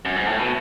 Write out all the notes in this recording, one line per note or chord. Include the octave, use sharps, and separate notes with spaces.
F#2
G#2
A2
B2